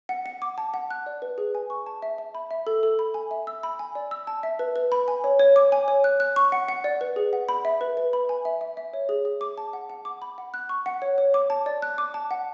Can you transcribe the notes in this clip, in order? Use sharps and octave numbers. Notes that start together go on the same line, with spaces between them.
F#5
F#5
D6
A5
F#5
F#6
D5
B4
G#4
G#5
C#6
A5
E5
E5
B5
E5
A4
A4
B5
G#5
E5
E6
B5
G#5
D5
E6
A5
E5
B4
B4
B5
G#5
C#5
C#5
D6
G#5
C#5
F#6
F#6
C#6
F#5
F#5
D5
B4
G#4
F#5
B5
E5
B4
B4
B5
G#5
E5
E5
E5
C#5
G#4
G#4
D6
A5
F#5
F#5
D6
B5
F#5
F#6
C#6
F#5
C#5
C#5
D6
A5
D5
F#6
D6
A5
F#5